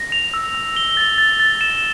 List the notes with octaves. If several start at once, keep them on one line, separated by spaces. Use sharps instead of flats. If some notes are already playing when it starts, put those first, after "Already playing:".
Already playing: A#6
F7
E6
E6
G7
A6
A6
A6
E7